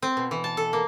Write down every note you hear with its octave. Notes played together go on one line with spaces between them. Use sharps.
C4
B2
E3
A5
A4
A#3